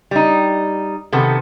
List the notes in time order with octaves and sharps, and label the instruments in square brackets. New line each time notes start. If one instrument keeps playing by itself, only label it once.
[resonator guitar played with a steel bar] G3 D#4
C3 D#3 B3 A4